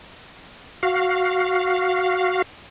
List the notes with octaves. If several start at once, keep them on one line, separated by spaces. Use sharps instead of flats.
F#4 F5